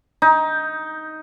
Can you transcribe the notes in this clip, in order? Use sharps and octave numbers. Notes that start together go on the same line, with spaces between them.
D#4